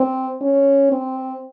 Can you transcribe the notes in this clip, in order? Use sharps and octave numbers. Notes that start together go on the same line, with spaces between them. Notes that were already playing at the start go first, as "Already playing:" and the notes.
Already playing: C4
C#4
C4